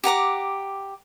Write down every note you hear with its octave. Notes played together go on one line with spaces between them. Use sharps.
G4 F#5 A#5 D6